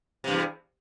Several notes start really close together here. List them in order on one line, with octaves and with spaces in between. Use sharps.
C3 G2 E2